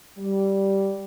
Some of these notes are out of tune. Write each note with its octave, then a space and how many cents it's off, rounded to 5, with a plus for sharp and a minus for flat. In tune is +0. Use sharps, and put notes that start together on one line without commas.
G3 -10